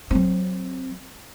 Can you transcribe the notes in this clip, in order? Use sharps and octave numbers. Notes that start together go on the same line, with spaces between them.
F#3 C4